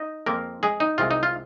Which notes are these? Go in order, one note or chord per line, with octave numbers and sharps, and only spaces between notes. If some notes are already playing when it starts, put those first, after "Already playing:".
Already playing: D#4 D#5
F2 F3 G#3 A#3 C4 A#4
G#3 G#4
D#4
C2 C3 G#3 C4 F4
D#4
F4